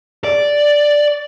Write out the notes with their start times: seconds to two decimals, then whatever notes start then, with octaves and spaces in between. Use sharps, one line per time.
0.24 D5